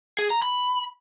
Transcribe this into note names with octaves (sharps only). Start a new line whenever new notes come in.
G#4
A#5
B5